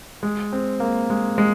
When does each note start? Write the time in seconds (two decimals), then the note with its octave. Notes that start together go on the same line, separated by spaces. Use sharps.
0.23 G#3
0.53 C4
0.80 A#3
1.10 G#3
1.38 G#3